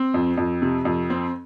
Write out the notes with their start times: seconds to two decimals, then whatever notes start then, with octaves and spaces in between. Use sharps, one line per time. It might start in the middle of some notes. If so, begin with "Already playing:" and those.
Already playing: C4
0.14 F2
0.37 F2
0.62 C3
0.85 F2
1.10 C4